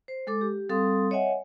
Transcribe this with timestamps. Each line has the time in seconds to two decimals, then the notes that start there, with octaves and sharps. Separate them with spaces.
0.08 C5
0.27 G#3 A4 D6
0.41 G4
0.69 G3 C4 A4 F5 C6 D#6
1.11 C#5 D#5 E5 F#5 G#5